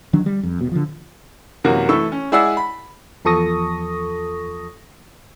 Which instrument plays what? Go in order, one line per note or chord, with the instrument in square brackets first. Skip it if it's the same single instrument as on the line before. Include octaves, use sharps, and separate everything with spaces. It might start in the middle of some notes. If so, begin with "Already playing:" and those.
[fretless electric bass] D1 D#3 F#3 D4
G3
F2
D#1 B2
D3 F3
[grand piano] F#2 C3 E3 A#3 F#4
E3 A3 E4 A4 C#6 E6
C#4
G#3 E4 G#4 D5 F#5 E6
B5
[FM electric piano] E2 F3 A4 C#6 D#6 A#6